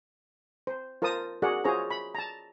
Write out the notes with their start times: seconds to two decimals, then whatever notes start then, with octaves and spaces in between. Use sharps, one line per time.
0.67 C5
1.02 F4 A#4 C5 A5 D#6
1.42 F#4 G#4 A#4 D5 F#5
1.64 F4 F#4 G#4 C5 C#5 A#5
1.90 B5
2.15 A5 A#5